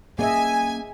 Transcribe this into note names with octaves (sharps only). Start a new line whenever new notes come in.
A#3 C#4 G#4 D#5 E5 G#5